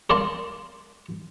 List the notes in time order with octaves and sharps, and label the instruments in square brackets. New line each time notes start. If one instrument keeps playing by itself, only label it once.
[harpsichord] A#4 D5 F5 A5 C6